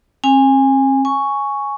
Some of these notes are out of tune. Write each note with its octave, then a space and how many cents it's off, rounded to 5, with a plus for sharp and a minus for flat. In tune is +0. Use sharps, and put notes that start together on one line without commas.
C4 +40 G#5 -20
G#5 +0 C#6 +0